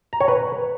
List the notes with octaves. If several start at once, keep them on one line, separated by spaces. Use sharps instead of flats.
A#5
C#5
B4